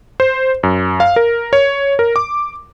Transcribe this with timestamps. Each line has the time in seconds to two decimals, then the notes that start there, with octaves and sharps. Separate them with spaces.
0.20 C5
0.63 F#2
1.00 F5
1.16 A#4
1.53 C#5
1.99 A#4
2.16 D6